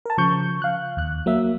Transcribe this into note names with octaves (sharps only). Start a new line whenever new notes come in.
A#4 A5
C#3 F3 C#6 G6
F5 F#6
D#2 F#6
F#3 A#3 E5